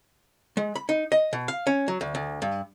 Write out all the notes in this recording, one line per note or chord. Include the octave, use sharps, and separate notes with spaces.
G#3
B5
D#4
D#5
B2
F5
C#4
F#3
D2
D2
G2